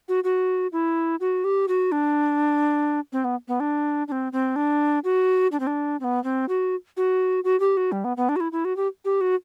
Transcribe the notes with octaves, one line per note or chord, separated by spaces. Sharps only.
F#4
F#4
E4
F#4
G4
F#4
D4
C4
B3
B3
D4
D4
C4
C4
D4
F#4
D4
C4
D4
C4
B3
C4
F#4
F#4
F#4
G4
F#4
G3
B3
B3
D4
F#4
E4
E4
F#4
G4
G4
F#4